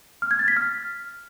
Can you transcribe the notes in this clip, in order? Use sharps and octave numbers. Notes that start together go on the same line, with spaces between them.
F6
G#6
A6
B6
F6